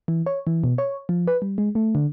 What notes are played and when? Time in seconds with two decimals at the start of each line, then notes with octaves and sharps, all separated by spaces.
0.08 E3
0.26 C#5
0.47 E3
0.64 B2
0.78 C#5
1.09 F3
1.27 B4
1.42 G3
1.58 G#3
1.75 A3
1.95 D3